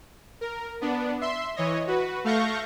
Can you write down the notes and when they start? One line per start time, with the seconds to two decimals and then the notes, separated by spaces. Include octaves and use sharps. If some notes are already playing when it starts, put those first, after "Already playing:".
0.41 A#4
0.81 B3 D4
1.21 E5 C6
1.56 E3 C#5 D#5
1.87 F#4 B4
2.24 A3 F5 C#6 G6 A#6